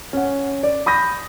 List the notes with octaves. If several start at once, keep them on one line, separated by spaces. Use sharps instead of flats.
C#4 F#5
D5
B5 D#6 G6 A#6